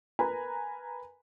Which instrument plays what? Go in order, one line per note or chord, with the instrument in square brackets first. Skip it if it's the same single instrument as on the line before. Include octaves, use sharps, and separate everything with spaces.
[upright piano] A#4 B4 G#5 A#5 B5